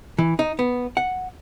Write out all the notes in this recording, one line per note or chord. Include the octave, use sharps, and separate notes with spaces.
E3
D#4
B3
F#5